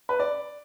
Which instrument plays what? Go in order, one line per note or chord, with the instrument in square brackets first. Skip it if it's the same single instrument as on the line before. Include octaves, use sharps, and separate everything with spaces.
[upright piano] B4
D5